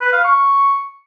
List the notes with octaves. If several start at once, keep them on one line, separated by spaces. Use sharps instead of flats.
B4
F5
C#6